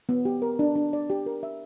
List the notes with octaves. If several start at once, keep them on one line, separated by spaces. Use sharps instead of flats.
B3
G4
A#4
D4
D4
D5
G4
A#4
E5